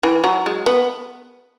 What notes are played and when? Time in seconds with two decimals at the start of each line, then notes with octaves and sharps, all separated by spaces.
0.03 E3
0.24 F#3
0.46 G#3
0.66 B3